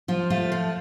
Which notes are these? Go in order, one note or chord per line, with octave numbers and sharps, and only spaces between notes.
F3 F4
A3 F4
F3